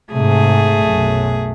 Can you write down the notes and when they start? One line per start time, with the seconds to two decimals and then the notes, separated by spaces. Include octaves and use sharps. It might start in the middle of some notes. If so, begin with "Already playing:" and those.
0.12 G#2 C3 A3 G#4
0.85 B1 F#2